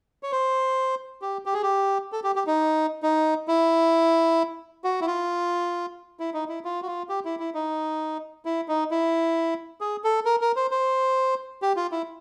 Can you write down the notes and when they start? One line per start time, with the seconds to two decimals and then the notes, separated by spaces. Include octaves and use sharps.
0.23 C#5
0.32 C5
1.22 G4
1.46 G4
1.53 G#4
1.62 G4
2.12 A4
2.24 G4
2.36 G4
2.47 D#4
3.03 D#4
3.48 E4
4.84 F#4
5.01 E4
5.07 F4
6.20 E4
6.34 D#4
6.49 E4
6.65 F4
6.82 F#4
6.87 F4
7.09 G4
7.25 E4
7.39 E4
7.54 D#4
8.45 E4
8.68 D#4
8.91 E4
9.81 G#4
10.04 A4
10.25 A#4
10.41 A#4
10.56 C5
10.71 C5
11.62 G4
11.76 F4
11.92 E4